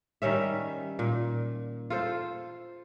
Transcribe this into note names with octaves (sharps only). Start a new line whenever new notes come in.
D#3 G3 C#4 E5
A#2
F4 A4 C5